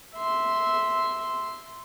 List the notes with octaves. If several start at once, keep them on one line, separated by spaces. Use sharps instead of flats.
E5 C6